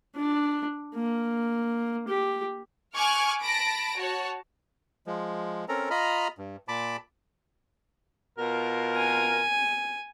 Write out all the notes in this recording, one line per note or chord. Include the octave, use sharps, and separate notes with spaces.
D4
A#3
G4
G#5 C#6 D6 F6 F#6 G#6
A5 B5 A#6 D7
F#4 C#5 A5
F3 G#3
C4 C#4 A4 A#4 A#5
F4 D#5 A#5 B5 F6
G2
A#2 A5 B5 D6
B2 F4 A#4
G#5